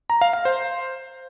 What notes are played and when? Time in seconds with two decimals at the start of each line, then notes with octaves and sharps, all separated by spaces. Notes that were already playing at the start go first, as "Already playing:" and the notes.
0.10 A#5
0.21 F5
0.33 F5
0.45 C5